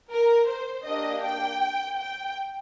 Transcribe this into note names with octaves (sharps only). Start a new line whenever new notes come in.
A#4
C5
A#3 D4 G4 D#5
G5
G5